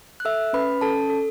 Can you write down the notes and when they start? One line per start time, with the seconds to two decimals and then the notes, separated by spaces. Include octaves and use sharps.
0.20 F#6
0.25 A4 E5 E6
0.53 C#4 B4 B5
0.81 C#4 A4 A5
1.10 A4